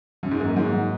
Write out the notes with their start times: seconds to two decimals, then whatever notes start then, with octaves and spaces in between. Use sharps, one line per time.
0.23 F#2 F#3
0.31 G#2
0.39 F#2 A#3
0.56 G#2 F#3
0.73 F#3